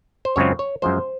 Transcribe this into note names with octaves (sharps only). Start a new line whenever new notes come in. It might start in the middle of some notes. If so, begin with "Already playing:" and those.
C5
F#2 C#3 G#3 C4 F4 C#5
C#5
F#2 F3 G#3 C5